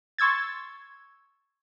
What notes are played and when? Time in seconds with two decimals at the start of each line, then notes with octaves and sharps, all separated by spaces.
0.18 C6 C#6 E6 G#6 A6